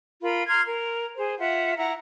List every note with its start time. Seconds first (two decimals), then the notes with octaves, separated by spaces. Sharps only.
0.22 F4 A#4 B5
0.48 A#5 C6 F6 G#6
0.66 A#4
1.17 G#4 C5
1.39 F4 E5 F#5
1.77 E4 F#5 A#5